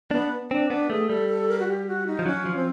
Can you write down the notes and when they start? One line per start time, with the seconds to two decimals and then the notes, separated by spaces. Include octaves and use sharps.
0.11 B3 D4
0.50 C4 D4
0.70 B3 D4
0.90 A3 G#4
1.09 G3 A4
1.29 A4
1.49 A#4
1.60 F#4
1.68 G4
1.87 F#4
2.07 D#4
2.19 F3
2.26 F#3 C#4
2.46 F3
2.56 C4